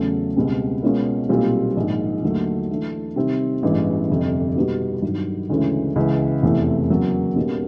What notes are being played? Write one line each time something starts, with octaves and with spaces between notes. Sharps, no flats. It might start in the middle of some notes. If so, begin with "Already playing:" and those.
Already playing: E2 C#3 F#3 A3 C#4
C#2 B2 G3 C4
B2 G#3 C#4 F4 A#4
B1 A#2 G3 C4 F4
A#1 G#2 D#3
D#2 D3 F#3 A3
E3 A3 D4
C3 D#3 G3 C4
A1 G2 E3 G#3 B3
G1 F2 C3
B2 G3 B3 D#4 F#4
G2 D#3 F#3
D2 C#3 E3 G#3 C#4
C#2 C#3 E3
F1 E2 C3 E3 A3
E2 C#3 F#3 A#3 C#4
B1 B2 G3 A#3 C#4